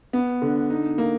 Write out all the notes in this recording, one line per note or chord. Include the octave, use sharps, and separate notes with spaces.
B3
D3
D#4
A#3